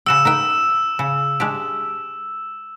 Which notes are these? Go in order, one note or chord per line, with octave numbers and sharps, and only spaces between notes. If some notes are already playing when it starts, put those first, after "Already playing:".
C#3 F#4 G5 E6 E7
D#4 B4 G5
C#3
G#3 D4 G4